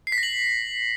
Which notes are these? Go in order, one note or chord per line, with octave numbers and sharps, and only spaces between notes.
C7
B6
A#6
F#7